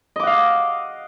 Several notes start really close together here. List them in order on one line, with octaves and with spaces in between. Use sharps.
D#5 D6 F#5 F5